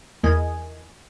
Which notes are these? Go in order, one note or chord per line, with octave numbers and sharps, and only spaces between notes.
E2 E3 A#3 D#5 G#5